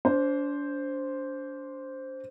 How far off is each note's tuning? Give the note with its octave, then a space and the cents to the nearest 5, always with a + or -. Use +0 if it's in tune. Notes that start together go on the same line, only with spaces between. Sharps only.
D4 -35 C5 +0